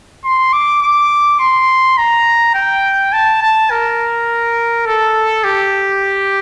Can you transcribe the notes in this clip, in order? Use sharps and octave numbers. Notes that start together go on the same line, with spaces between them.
C6
D6
D6
C6
A#5
G5
A5
A5
A#4
A4
G4